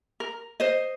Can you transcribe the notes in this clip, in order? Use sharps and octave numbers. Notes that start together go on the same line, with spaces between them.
A#4
C5 D#5